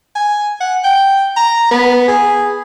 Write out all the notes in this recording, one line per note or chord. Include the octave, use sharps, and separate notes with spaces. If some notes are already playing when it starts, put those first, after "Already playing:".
G#5
F#5
G5
A#5
B3
G#4